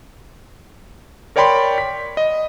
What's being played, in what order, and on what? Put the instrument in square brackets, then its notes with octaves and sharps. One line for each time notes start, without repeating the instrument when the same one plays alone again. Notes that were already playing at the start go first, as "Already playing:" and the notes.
[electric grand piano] A#4 C#5 D5 G5 B5 C6
B6
D#5